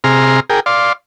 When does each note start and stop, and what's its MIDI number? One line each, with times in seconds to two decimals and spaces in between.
0.04 0.40 48
0.04 0.40 68
0.04 0.40 82
0.04 0.40 84
0.04 0.40 89
0.50 0.60 68
0.50 0.60 70
0.50 0.60 79
0.66 0.93 74
0.66 0.93 77
0.66 0.93 84